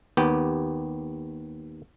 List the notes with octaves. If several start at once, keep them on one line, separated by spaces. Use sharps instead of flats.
D#2 B3 G4 G5